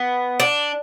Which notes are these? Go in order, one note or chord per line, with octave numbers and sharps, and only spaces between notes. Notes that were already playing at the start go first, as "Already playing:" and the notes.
Already playing: B3
D4